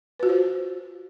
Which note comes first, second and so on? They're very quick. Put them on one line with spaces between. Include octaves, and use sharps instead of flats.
B4 F#4 F4 C5